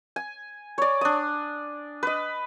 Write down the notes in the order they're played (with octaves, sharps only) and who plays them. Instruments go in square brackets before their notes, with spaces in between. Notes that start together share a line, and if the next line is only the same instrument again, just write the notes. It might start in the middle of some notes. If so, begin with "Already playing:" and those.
[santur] G#5
C#5 D5
D4 D#6
B4 D#5